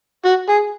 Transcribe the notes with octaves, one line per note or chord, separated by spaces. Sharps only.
F#4
G#4